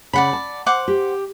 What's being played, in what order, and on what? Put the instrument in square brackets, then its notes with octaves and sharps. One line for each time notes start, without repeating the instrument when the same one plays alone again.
[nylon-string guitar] C#3 [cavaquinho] D5 F#5 B5
[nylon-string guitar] A5
[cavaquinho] C5 F#5 D6
[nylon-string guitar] G4